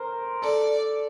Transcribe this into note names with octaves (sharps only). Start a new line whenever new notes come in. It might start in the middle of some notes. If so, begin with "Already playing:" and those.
Already playing: A#4 C5
A4 D5